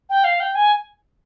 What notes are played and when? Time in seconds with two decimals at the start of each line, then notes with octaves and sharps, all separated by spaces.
0.10 G5
0.24 F5
0.40 G5
0.55 G#5